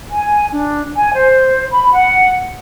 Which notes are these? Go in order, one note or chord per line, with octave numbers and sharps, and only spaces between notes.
G#5
D4
G#5
C5
B5
F#5